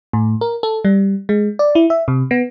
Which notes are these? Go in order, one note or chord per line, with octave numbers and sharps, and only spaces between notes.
A2
A#4
A4
G3
G#3
D5
E4
E5
C3
B3